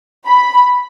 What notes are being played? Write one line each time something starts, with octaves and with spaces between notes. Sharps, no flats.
B5